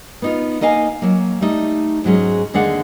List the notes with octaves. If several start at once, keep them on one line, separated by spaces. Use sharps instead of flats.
B3 D#4 F4
A#3 D#4 D#5 F5 G#5
F#3 A#3
G3 A3 D#4
G#2 F#3 G#3 C#4
D#2 D3 G#3 D4 F5 F#5